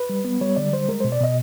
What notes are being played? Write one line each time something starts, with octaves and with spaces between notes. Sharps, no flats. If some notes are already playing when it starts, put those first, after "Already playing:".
Already playing: B4
G3
B3
G3 C#5
D3 D5
G3 C5
G#3 A#4
B2 C5
D5
B2 D#5